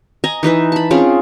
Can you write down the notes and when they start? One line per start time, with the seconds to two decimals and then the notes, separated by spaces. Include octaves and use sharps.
0.24 D#5 G#5 A#5
0.43 E3 D#4 B4 E5
0.72 A5 B5
0.91 C4 C#4 F4 G#4